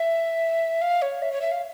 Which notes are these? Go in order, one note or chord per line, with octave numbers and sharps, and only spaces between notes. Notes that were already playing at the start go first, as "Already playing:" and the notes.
Already playing: E5
F5
C#5
E5
C#5
E5
F5